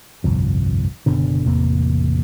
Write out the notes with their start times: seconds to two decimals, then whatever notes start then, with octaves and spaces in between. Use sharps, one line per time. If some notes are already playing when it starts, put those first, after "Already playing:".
0.24 G1 C2 F2
1.06 F#1 B2 D3
1.45 A1 E2 C3 A#3